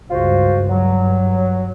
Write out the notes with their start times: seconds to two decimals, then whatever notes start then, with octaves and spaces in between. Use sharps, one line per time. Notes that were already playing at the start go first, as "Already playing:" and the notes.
0.11 C#2 G2 F4 F#4 C5
0.70 G2 F#3